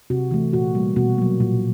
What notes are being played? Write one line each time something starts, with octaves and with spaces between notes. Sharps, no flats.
C3 F#4
E3 A3
A#2 F#4
G3 A#3
B2 F#4
F#3 A#3
A#2